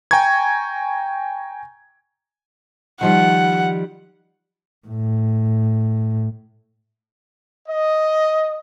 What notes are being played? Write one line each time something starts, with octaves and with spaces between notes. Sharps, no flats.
G5 G#5 A#5 C#6 G#6
D#3 F3 G3 F#5
A2
D#5